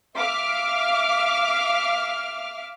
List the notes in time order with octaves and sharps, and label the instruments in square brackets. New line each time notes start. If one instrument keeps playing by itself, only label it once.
[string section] E5 F5 D6 F6